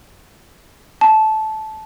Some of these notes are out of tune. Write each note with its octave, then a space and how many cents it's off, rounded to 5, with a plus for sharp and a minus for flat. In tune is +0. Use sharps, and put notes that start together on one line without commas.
A5 -15